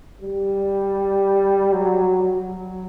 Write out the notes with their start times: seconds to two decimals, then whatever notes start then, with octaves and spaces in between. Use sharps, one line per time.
0.21 G3
1.73 F#3
2.23 F#3